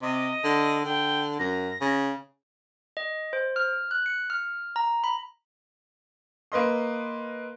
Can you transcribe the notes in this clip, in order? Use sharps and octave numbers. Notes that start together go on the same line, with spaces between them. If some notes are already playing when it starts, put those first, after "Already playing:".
C3 D#5
D3
D3 G5
F#2 A#6
C#3
D#5
C5
F6
F#6
C#7
F6
A#5
B5
A#3 B4 D#5 C6